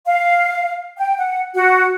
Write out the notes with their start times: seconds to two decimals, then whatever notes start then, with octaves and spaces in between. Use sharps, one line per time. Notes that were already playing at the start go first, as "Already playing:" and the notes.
0.05 F5
0.98 G5
1.18 F#5
1.54 F#4